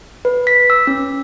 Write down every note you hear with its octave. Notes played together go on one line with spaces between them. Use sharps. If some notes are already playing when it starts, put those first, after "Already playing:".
B4
B6
E6
C#4